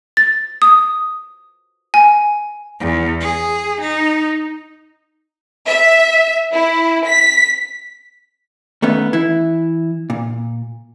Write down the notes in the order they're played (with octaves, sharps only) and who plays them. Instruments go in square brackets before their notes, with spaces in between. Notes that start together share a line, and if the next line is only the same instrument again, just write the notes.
[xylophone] A6
D#6
G#5
[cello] E2
G#4
D#4
[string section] E5
E4
B6
[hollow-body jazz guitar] D#2 A3 B3 C#4
E3 E4
A#2